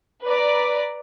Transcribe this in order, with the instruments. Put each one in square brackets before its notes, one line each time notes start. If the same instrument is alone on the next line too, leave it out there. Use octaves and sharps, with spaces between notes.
[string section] B4 D5 A#5